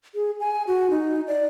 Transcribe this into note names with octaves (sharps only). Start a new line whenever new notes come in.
G#4
G#5
F#4
D#4
D5